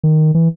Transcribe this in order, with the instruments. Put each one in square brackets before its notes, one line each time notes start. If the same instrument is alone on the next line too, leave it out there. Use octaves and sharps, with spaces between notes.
[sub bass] D#3
E3